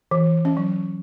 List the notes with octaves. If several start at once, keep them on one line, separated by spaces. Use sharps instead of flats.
E3
C#4
F#3